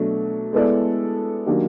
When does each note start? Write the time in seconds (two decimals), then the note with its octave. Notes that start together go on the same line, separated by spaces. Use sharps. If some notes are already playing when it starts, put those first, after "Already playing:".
Already playing: B2 F#3 A3 D4
0.53 G#3 B3 E4 A4 D5
1.46 D#3 F#3 A#3 D4 G4